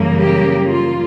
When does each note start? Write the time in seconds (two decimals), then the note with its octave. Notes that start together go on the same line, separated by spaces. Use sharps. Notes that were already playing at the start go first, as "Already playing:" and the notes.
Already playing: F#2 C#3 E3 G3 A#3
0.17 G4
0.68 F4